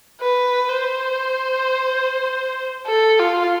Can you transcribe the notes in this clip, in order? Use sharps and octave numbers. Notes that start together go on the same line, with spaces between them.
B4
C5
A4
F4